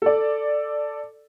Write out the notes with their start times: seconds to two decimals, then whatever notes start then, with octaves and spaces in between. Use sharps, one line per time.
0.02 A4 D5